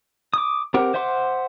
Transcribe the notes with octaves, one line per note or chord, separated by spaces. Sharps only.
D6 D#6
C4 G4 A#4 F#5
C5 E5 F#5 C6 D6